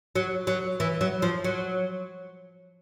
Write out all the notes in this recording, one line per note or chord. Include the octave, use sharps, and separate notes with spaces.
F#3
F#3
E3
F#3
F3
F#3